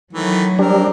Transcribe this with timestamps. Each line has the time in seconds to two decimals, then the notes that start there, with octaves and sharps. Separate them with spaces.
0.13 D#3 E3 F#3 A3
0.59 G3 G#3 C4 D4 A#4